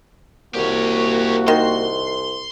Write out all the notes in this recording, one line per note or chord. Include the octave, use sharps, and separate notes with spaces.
C2 A#3 F#4 G4 C#5
D#3 C6